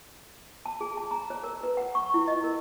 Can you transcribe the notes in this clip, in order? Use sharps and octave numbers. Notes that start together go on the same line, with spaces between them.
A5
G#4
A5
A#5
C#5
A#4
B4
F#5
C#6
E4
D#5
A#4